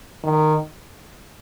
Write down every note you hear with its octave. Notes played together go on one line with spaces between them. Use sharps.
D#3